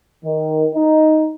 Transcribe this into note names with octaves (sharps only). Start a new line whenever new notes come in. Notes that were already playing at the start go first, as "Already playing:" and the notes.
D#3
D#4